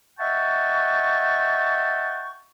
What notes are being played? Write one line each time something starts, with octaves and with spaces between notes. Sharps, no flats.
D#5 E5 F#5 G5 A5 C#6